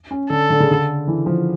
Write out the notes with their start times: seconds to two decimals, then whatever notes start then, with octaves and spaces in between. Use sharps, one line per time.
0.11 C#4
0.30 D3 A4
0.50 D3
0.60 C#3
0.71 D3
1.07 E3
1.26 F3